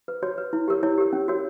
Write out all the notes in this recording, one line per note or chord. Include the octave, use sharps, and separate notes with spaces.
B4
F#4 C#5
B4
E4
G4 A#4 C#5
E4 C#5
G4 A#4 C#5
C#4
F#4 A#4 C#5